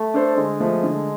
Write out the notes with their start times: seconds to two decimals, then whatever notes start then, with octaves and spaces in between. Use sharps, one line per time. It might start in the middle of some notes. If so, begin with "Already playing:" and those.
Already playing: A3
0.14 D4 A4 C5
0.37 D3 G#3
0.60 F3 A3
0.83 D3